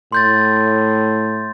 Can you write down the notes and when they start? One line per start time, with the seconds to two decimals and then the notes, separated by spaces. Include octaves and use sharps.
0.12 A2 C6 G6 A6